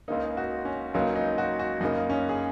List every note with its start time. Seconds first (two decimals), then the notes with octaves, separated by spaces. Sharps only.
0.08 C#2 C#3 A#3 D#4
0.37 F#4
0.65 C#4
0.94 C#2 C#3 F#3 A#3 D#4
1.16 D#4
1.38 F#4
1.59 F#4
1.80 F#2 C#3 A#3 D#4
2.10 C#4
2.29 G#4